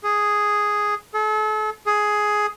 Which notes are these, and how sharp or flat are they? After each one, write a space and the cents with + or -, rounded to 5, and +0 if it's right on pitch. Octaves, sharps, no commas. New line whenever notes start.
G#4 +0
A4 -40
G#4 +10